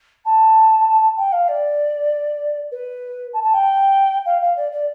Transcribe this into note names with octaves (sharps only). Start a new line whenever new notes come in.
A5
G5
F5
D5
B4
A5
A5
G5
F5
F5
D5
D5